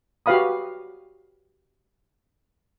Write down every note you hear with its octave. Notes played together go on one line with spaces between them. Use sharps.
F#4 G4 B4 F5 B5 D#6